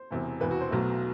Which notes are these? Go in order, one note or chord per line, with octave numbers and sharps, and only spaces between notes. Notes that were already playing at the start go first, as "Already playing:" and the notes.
Already playing: C5
E1 E2 C3
E1 E2 C3 B4
F#4
C5
B1 B2 F#3 A3